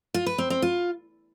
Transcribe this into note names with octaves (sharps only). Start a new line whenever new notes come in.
F4
B4
C4
C4
F4